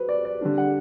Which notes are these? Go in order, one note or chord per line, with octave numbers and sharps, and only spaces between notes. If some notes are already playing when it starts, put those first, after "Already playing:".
Already playing: F#3 C4 B4
D5
D5
D3 G3 D4
F#5